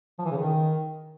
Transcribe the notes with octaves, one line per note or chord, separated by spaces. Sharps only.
F3
E3
C#3
D#3